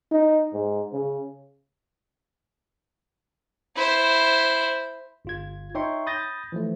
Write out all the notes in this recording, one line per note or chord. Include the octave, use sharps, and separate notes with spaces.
D#4
G#2
C#3
E4 C5
G1 F4 G#6
D#4 C#5 E5 G5 C6 C#6
B5 D#6 G6 A6 A#6
E3 F3 A3